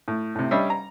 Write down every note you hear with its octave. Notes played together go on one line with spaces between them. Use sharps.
A2
A2 C3
G3 C#4 D4 D#5 E5
A#5